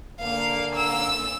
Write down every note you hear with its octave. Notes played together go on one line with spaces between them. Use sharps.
D3 A#3 F5
E6